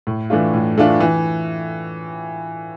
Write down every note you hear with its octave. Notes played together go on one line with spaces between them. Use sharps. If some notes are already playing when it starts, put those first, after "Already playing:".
A2
E3 A3 D4 F4
A2
E3 A3 D4 F4
E3